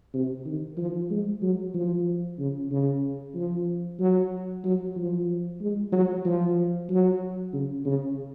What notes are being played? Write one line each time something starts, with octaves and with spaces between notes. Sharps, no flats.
C3
D#3
F3
G#3
F#3
F3
C#3
C#3
F3
F#3
F#3
F3
G#3
F#3
F3
F#3
C#3
C#3